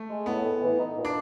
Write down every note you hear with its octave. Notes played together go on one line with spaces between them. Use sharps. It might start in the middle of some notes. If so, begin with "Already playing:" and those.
Already playing: A3
G#3
A2 B3
A2
E3
D#4
A#2
D4